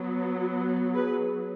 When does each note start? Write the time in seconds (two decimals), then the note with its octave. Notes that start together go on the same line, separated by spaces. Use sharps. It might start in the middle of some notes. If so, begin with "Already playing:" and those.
Already playing: F#3 B3
0.95 G#4 B4